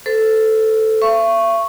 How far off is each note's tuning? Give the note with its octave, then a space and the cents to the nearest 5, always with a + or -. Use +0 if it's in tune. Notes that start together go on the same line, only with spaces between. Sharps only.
A4 +0 C5 -35
E5 +45 C#6 -5